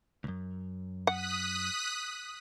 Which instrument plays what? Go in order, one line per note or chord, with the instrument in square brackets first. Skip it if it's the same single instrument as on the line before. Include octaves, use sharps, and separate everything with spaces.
[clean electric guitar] C#2 F#2
[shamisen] F#5 [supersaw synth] D#6 F#6 B6